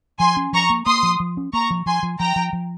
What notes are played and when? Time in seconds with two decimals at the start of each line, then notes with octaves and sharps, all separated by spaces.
0.19 F3 G#5 C6
0.37 C#4
0.53 F3 A#5 C#6
0.70 A#3
0.86 A#3 C6 D#6
1.03 F3
1.20 F3
1.37 C#4
1.53 A#3 A#5 C#6
1.70 F3
1.86 F3 G#5 C6
2.03 F3
2.19 F3 G5 A#5
2.36 F3
2.53 F3